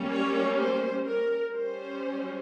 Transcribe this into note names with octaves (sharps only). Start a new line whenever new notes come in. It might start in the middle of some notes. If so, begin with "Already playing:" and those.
Already playing: G3 A#3 C#4
C#5
C5
A#4
G3 C#4 C5